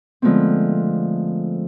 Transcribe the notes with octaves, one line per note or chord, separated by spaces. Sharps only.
D3 F3 G#3 A3 B3 C4